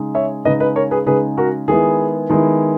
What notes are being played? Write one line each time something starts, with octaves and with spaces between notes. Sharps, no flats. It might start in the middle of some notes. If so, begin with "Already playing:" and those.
Already playing: C#3 G#3 D#4
C#5 E5
C#3 G#3 D#4 B4 D#5
B4 D#5
A#4 C#5
G#4 B4
C#3 G#3 D#4 G#4 B4
F#4 A#4
D#3 G#3 B3 E4 G#4
D#3 G#3 B3 E4